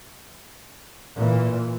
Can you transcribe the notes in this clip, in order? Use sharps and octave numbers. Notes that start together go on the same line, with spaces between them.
A#2 E3